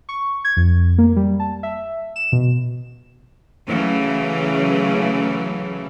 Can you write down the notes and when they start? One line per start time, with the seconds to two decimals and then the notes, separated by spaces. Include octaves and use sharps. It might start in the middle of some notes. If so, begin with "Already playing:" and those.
0.09 C#6
0.45 G#6
0.57 F2
0.98 A#3
1.16 G3
1.40 A5
1.63 E5
2.16 E7
2.32 B2
3.68 C#3 E3 F#3 A3